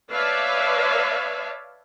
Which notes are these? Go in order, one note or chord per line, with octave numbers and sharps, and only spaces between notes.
B4 C#5 D5 E5 F5 A5